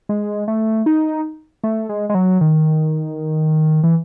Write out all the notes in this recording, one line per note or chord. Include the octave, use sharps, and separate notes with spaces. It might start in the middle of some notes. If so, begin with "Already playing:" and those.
G#3
A3
D#4
A3
G#3
G#3
F#3
D#3
E3